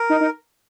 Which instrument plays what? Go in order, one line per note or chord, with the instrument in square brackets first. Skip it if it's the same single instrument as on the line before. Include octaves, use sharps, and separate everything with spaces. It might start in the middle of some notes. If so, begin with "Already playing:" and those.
Already playing: [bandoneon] A#4
[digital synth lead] D#4
D#4